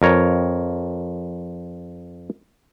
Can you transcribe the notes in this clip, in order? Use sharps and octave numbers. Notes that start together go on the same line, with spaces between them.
F2 A#4 C#5 A#5